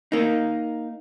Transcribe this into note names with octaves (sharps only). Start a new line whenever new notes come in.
A#3 D#4